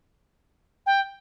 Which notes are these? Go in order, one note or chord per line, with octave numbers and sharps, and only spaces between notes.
G5